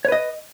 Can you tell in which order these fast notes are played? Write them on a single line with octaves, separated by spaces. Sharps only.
C#5 B4 D#5